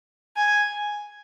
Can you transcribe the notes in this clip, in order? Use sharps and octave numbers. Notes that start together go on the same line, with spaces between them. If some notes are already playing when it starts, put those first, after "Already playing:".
G#5